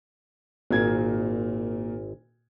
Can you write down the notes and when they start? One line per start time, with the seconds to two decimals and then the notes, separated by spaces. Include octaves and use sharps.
0.71 G#1 A#2 A#3 G#6